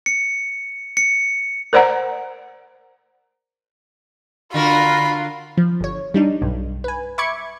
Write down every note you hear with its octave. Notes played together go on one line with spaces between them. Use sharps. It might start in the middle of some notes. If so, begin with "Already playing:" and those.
C#7
C#7
A#4 C5 D5 F#5 A#5
D3 F4 F#4 A#4 B5
F3
G1 C#5
G3 D4 D#4
B1 G2
B4 G#5
E5 B5 C#6 D6 G#6 C#7